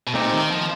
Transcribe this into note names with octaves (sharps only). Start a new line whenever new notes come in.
B2
A#2 A3 C4 D#4 G4
D#3
F3